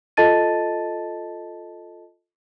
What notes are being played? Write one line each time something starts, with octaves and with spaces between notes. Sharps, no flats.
F4 A4 D#5 A5 A6 D#7